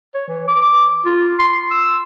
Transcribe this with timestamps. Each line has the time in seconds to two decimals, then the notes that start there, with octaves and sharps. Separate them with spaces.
0.14 C#5
0.28 E3
0.48 D6
1.05 F4
1.39 C6
1.71 E6